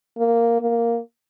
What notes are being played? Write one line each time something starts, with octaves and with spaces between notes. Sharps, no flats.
A#3
A#3